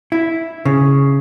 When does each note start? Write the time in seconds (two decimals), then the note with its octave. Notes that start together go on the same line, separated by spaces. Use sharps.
0.12 E4
0.65 C#3